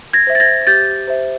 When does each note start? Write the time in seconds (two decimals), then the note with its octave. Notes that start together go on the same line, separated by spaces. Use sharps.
0.13 G#6 A#6
0.27 C5 E5
0.35 A6
0.40 G#6 A#6
0.67 G4 G6 A6
1.07 C5 E5